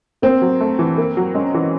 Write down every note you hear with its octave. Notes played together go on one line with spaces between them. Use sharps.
A#3 C4
F#3
A3
E3
A#3
F#3
G#3 C#4
E3